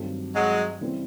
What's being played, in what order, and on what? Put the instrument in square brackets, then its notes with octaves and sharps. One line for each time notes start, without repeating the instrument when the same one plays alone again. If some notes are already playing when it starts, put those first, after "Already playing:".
Already playing: [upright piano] G2 D#3 F#3 A3 C4
[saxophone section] F#3 G#3
[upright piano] C#3 E3 G3 C4 E4